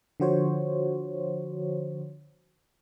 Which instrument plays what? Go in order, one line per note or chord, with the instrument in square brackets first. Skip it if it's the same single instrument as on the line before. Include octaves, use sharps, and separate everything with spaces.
[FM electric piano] D3 F3 F#4 C5 C#5